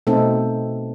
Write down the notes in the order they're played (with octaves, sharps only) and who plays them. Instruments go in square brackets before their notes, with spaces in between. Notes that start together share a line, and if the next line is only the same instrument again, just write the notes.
[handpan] B2 A3 C4 D#4 A4